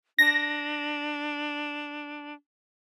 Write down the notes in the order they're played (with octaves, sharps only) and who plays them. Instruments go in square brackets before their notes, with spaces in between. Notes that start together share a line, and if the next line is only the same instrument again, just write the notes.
[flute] D4 [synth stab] A#6